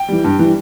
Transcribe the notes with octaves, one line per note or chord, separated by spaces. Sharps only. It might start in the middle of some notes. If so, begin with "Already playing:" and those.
Already playing: G5
E3 G3
G2
E3 G3